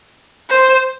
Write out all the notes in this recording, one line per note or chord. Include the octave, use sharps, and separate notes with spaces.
C5